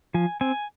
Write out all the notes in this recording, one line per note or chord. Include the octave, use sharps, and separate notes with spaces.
F3 G#5
C4 G#5